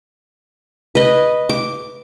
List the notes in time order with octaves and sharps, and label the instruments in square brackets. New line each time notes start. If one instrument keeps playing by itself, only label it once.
[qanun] B4 D#5
D6